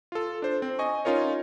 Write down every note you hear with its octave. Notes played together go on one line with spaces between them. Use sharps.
F4 A4
D4 C5
C4
D#5 G#5 C#6
C#4 D#4 F4 A#4 C#5